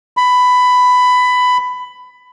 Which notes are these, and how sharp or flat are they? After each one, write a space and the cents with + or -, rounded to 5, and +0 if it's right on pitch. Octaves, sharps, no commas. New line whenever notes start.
B5 +15